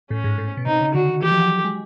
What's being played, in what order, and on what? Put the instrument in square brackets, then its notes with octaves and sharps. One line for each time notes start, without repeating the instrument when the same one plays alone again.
[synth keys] A2 [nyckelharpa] C#4
[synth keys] G#2
A2
B2
[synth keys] C3 [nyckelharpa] D#4
[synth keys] C#3
[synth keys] D3 [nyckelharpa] F#4
[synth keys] D#3
[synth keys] E3 [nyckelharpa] G4
[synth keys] F3
F#3
G#3